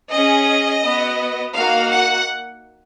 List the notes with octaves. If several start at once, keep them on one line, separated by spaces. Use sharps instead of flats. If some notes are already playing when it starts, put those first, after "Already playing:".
C#4 G#4 D#5
B3 F#4
A#3 D#4 F#4 F5
F#5